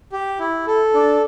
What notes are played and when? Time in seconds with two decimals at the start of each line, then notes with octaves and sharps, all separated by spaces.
0.12 G4
0.39 E4
0.67 A4
0.94 D4